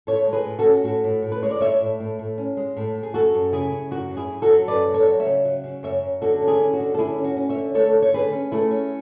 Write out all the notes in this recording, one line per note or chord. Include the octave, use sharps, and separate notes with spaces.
A2 A4 C#5
G#3
G#4 B4
A2
F#4 A4
C#4
A2 F#4
A2
A2
B4
G#3 C#5
D5
A2 C#5 E5
A2
A2
A2
C#4
G#3
A2
A2
G#4
F#2 F#4 A4
F#2
C#3 E4 G#4
C#3
F#2 F#4
F#2
E4 G#4
F#2
F#4 A4
F#3
F#2 B4 D5
F#3
A4 C#5
F#3
C#5 E5
C#3
F#3
C#3
F#2 C#5 E5
F#2
D3 F#4 A4
C#4
E4 G#4
C#4
F#4
D3
A4
C#4 E4 G#4
C#4
F#4
C#4
C#5 E5
D3
A3 A4 C#5
A3
C#5
D3 G#4 B4
C#4
A3 E4 G#4
C#4